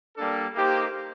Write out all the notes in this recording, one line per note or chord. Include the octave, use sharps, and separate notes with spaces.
G3 A#3 D4 A4
A#3 D#4 G4 C5